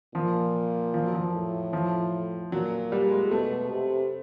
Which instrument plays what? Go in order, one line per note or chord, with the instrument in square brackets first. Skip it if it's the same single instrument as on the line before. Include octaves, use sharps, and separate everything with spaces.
[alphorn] A#2 [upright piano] F3
[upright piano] F3
F#3
F3
[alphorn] A2
[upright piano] F3
[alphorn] A#2 [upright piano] F#3
[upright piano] G3
G#3
[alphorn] B2 [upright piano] A3
[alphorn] C3